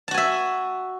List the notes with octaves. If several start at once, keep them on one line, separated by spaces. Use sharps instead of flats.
F#4 E5 G#5 A5